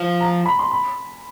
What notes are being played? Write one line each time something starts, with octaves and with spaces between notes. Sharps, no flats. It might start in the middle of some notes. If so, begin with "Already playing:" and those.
Already playing: F3
A#5
B5
C6
B5